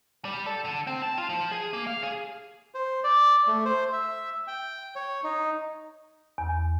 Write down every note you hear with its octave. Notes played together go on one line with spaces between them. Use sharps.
G3
A4
D3
C4
A5
F4
F3
G#4
A#3
F5
G#4
C5
D5
A3
C5
E5
G5
C#5
D#4
E2